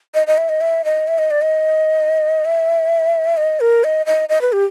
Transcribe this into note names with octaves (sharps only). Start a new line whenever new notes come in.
D#5
D#5
E5
D#5
E5
D#5
E5
D#5
D5
D#5
E5
D#5
A#4
D#5
D#5
D#5
B4
G4